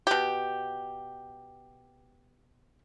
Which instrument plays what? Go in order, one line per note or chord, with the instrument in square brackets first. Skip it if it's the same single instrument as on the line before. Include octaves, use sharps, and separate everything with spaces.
[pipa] B2 G4